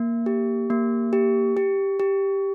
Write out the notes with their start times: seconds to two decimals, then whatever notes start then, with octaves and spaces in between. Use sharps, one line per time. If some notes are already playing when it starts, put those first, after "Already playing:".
Already playing: A#3
0.26 G4
0.70 A#3
1.13 G4
1.57 G4
2.00 G4